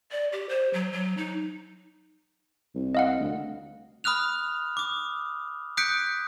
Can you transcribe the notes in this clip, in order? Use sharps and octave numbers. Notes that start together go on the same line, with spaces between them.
D5
G4
C5
F#3
F#3
D#4
C2
D#5 F5 F#5
D2
B5 D#6 F6 F#6 F7
D6 D#6
D#6 F#6 G6 B6 C#7 D7